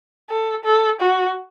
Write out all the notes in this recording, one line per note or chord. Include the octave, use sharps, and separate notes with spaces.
A4
A4
F#4